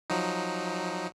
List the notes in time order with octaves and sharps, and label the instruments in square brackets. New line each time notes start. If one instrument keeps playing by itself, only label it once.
[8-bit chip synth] F3 F#3 D#4